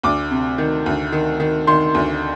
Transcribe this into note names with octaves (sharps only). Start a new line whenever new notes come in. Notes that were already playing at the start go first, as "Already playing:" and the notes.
D2 D6
C3
D#3
D2
D#3
D#3
D#3 C6
D2